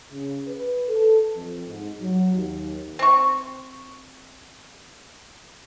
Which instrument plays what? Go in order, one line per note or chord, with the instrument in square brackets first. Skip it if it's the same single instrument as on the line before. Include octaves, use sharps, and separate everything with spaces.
[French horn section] C#3
B4
A4
F2
G#2
F#3
D#2
[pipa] C4 C#6